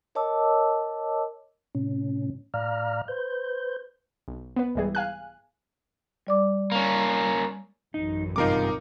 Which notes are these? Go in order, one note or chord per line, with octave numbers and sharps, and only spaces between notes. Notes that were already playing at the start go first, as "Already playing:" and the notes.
A#4 C#5 D#5 A5 D6 E6
A2 C3 C#4
A2 D5 F5 A#5 F6
B4 C5 G6
B1
B3 B4
C2 G#2 E3 G3 G#4
F5 G#5 F#6
G3 D5 D6
A#3 C#4
A1 F#2 D#4
G2 C3 D#4 F4 A#4 D6